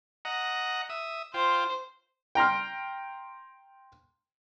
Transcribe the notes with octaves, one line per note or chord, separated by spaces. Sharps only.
D#5 F#5 A#5
E5 D#6
F4 C5 G5
G5 A#5 C6 F6